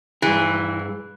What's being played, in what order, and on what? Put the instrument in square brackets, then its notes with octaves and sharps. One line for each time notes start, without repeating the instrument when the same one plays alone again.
[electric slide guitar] G2 G#4 [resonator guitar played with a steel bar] E3